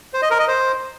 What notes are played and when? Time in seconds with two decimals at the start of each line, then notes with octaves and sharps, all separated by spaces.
0.14 C5
0.22 D#5
0.31 A#4
0.39 D#5
0.48 C5